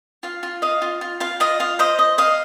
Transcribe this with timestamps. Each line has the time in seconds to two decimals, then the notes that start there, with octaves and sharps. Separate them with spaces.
0.23 F4 F5
0.43 F4
0.62 D#5 F5
0.82 F4
1.01 F4
1.20 F4 F5
1.40 F4 D#5
1.60 F4 F5
1.79 C5 D#5
1.99 D#5
2.18 D#5 F5